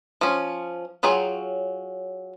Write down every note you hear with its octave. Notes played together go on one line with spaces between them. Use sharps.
F3 C#4
F#3 F4 G#4 C#5 G5